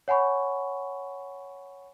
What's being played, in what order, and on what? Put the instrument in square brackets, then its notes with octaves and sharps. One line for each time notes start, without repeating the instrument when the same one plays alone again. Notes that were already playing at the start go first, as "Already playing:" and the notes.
[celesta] C#5 F#5 G#5 B5 C#6